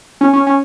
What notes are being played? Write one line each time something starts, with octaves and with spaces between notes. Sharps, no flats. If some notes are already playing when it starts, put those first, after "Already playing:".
C#4
C#4
C#4